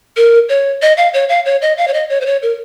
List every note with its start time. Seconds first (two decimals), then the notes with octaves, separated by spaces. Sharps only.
0.16 A#4
0.49 C#5
0.82 D#5
0.97 F5
1.14 C#5
1.29 F5
1.45 C#5
1.62 D#5
1.78 F5
1.88 C#5
1.94 D#5
2.10 C#5
2.21 C5
2.26 C#5
2.43 A#4